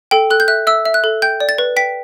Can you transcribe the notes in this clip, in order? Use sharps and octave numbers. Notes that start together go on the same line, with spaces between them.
A4 G5
A4 F#6
G6
E5 F#6
E5 E6
E5
F#6
A4
G5 G6
D5
A6
B4
G5 B6